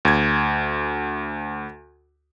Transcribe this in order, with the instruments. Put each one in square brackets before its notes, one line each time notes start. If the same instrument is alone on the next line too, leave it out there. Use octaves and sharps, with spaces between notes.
[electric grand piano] D2 G#6